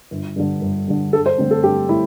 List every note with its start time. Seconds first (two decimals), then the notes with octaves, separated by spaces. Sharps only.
0.11 G1
0.36 G2 D3
0.61 G1
0.88 G2 D3
1.13 G2 A4
1.26 C5
1.38 D3 A3 C4
1.51 A4
1.63 G2 G4
1.88 D3 A3 E4